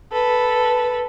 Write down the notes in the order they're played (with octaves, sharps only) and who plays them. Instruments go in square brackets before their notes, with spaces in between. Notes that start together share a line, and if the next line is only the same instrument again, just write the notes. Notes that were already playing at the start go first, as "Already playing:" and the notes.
[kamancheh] A4 B4